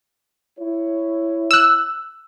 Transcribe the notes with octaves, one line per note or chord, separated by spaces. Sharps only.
E4 C#5
E6 F#6